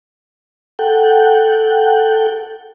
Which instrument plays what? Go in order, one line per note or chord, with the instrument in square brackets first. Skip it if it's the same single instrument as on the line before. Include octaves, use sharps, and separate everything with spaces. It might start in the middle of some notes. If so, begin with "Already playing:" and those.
[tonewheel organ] A4 F#5 G5